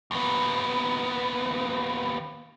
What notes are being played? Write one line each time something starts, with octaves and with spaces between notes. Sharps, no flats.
D#2 B3